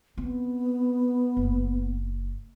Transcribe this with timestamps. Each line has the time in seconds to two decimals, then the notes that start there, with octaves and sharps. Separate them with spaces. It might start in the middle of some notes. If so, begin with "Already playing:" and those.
0.18 B3 C4
1.37 F#1